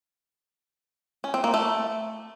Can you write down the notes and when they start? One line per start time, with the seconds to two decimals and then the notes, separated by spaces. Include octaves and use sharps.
1.24 C#4
1.34 C4
1.44 A#3
1.54 A3